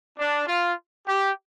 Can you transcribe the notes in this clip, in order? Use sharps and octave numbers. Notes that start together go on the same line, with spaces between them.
D4
F4
G4